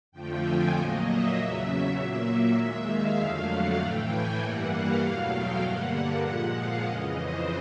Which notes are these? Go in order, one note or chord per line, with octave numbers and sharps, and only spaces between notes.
F2 D3 F3 A3 G5
G#5
A#2 F#3 A#3 D#5
E5
E2 C#3 F#3 E5
A#2 F#3 A#3 E5
D#2 D#3 G#3
F5
F2 D3 F#3 A3
F#5
A2 E3 A3 G5
G#5
G2 E3 G3 A#3 F#5
F5
E2 B2 F#3 A3 F5
G5
G2 D3 G3 A#3 F#5
A#2 F3 G#3
F5
F2 C#3 E3 D#5
C5